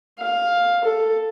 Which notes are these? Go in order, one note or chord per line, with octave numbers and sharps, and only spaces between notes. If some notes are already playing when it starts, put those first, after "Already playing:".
F5
A4